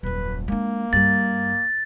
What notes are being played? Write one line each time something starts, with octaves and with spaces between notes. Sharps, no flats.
D#1 F#2 B4
G#3 A#3 D4
G2 G3 A6